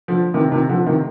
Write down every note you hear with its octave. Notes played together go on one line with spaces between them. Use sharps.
D3 F3
C3 D#3
C3 D#3
D3 F3
C3 D#3